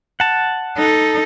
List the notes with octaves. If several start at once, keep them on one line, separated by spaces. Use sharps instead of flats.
F#5 A5
D#4 A4